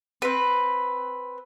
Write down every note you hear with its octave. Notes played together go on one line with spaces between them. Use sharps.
C4 B4